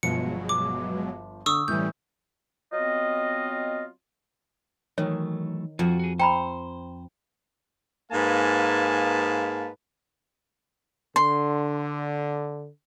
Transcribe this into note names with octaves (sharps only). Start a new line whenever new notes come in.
G1 B2 F3 F#3 G#3 C#7
D6
D3 C#6 D#6 E6
A2 E3 G3 C#4 G6
F#3 B3 C4 F4 D#5
D#3 E3 F#3 A3 C#5
F2 F4 F#4
F#4 G#4
C4 C5 G5 A#5 B5
G#2 A#3 B4 F5 G#5 A5
D3 C6